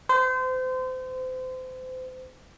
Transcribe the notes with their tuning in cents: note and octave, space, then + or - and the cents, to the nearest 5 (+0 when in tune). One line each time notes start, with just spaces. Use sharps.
C5 -30